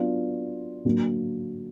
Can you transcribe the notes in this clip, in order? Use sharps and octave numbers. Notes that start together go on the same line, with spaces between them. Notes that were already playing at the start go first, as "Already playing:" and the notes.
Already playing: F#3 B3 D4 F4
D3 F#3 A#3